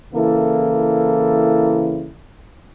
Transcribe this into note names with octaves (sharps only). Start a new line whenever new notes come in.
C#3 E3 A#3 E4 A4